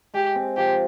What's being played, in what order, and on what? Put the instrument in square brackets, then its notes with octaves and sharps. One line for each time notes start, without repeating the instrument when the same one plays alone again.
[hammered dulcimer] G#3 [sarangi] G4
[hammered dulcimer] C4
[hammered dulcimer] F3 [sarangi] G4